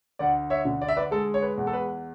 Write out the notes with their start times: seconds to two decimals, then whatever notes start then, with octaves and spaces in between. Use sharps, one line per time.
0.19 D2 D5 F#5
0.50 C#5 E5
0.65 D3
0.82 D5
0.88 E5
0.96 B4 D5
1.11 G#3 A4
1.34 C#5
1.42 B4
1.58 E2
1.67 A4
1.73 B4